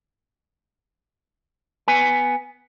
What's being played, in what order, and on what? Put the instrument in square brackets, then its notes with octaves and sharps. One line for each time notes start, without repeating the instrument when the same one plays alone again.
[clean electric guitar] B3 B4 G#5